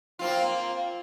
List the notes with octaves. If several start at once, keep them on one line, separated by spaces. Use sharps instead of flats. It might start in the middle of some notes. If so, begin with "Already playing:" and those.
A#3 C4 F4